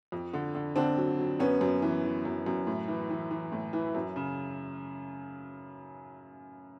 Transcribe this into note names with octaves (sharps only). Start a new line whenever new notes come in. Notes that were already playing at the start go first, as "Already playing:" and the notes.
F2
D3
D3
D3 C4 D4
F#3
F#3
F#2 B3 C#4
F#2
E3
E3
F#2
F#2
A2
E3
E3
E3
A2
E3
F#2
C#3